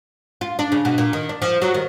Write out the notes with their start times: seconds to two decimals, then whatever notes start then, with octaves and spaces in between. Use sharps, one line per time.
0.41 F4
0.59 D4
0.72 C#3
0.85 B2
0.98 A#2
1.13 D#3
1.29 D4
1.42 F3
1.62 F#3
1.74 D#3